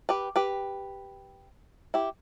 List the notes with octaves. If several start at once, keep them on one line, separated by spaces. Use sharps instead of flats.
G4 B4
G4 B4
E4 G4